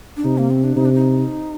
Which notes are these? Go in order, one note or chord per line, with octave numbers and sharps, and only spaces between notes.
D4
C3 D#4
A#3
C4
D4
C3 D#4
D4
D#4